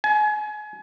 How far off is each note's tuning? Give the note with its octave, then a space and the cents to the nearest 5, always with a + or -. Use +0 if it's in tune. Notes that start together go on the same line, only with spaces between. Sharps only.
G#5 +30